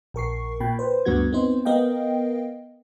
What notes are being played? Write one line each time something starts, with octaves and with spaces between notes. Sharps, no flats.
A#1 A#4 C#6 C7
A#2 G5 B5
B4 C5
D2 G2 D3 B3 F#4 G#6
B3 C4 D#4 C5
B3 A#4 D#5 F5 G5